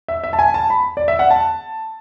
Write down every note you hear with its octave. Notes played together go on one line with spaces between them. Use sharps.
E5
E5
A5
G#5
A5
B5
D5
E5
F#5
A5